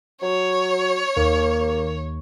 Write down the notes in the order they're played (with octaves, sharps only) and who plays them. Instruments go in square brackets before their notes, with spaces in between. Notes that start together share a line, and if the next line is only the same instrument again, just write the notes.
[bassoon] F#3 [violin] C#5
[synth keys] D#2 [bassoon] A#3